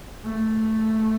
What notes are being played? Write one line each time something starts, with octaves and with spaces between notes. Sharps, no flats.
A3